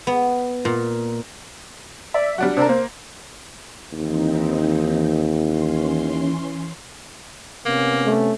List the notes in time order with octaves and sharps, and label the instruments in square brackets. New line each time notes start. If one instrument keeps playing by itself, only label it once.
[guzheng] B3
A#2
[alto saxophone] D5 [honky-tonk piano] E5
[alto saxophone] F#3 [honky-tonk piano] G3 D4 F#4
[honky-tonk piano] C3 C4 A#4 [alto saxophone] D4
[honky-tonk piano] A#3 [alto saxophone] C5
[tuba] D#2 [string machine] E3 C4 D#4
[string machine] E3 C#4 C6
[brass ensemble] C3 B3 C#4 [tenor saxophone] A#3
[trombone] A3